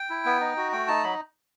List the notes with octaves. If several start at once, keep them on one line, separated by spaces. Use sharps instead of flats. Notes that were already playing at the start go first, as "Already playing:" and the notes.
Already playing: G5
E4
B3
D#4
F#4
A3 G5
D#4 A5
F#3 B5